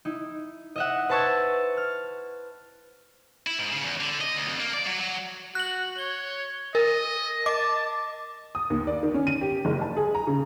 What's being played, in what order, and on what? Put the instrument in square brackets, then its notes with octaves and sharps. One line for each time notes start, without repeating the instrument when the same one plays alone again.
[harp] D#4 E4
D#5 E5 F#5
B4 C5 A5 C#6 E6 G#6
F6
[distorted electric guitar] E4
G#2
C#3
E2
D3
D#5
D2
F2
A#3
D5
F#3
F#3
[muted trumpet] F#4 [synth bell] F#6 F#7
[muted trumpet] C#5 [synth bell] G7
[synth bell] A#4 [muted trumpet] D#5
[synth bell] D#5 D6 [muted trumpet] A5
[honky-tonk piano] D#6
D#2
D5
D#3
C#4
D#7
G4
F#1
A5
G#4
A#5
C#3